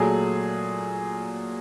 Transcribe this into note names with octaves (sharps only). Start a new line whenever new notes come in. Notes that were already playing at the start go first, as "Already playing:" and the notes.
Already playing: A#2 F#3 A3 G#4